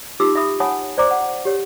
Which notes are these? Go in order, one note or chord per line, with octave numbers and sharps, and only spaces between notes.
D#4 F4 G4 D6 E6
E5 B5 D#6
C#5 F#5 G#5 A5 B5 D#6
C5 D5 A#5 D6
F#5
G4 C#5